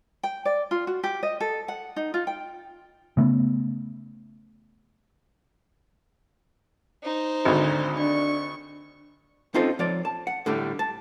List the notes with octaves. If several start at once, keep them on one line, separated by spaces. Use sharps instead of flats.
G5
D5
F4
F#4
G4
D#5
A4
F#5
D#4
F4
G5
C#3 A3 B3
D#4 C5
G#1 D2 D4
D4 C#6
C4 C#4 D#4 F4 A4 C5
F3 C#5 D5
A5
F#5
A2 D3 G3 A3
A5